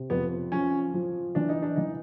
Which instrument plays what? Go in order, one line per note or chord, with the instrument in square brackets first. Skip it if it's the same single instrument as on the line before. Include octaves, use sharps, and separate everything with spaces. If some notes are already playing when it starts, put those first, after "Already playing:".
Already playing: [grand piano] C3
[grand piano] F2 [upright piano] B3
[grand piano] F3 [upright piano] C#4
[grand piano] F3
[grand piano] E3 [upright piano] D4
[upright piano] D#4
D4
[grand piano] E3 [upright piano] D#4